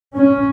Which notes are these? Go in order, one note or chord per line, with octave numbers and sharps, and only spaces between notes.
C#4